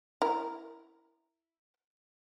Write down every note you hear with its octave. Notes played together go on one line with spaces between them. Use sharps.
E4 A#4